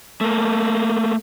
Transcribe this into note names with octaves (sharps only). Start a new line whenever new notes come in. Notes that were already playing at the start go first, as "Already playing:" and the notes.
A3 A#3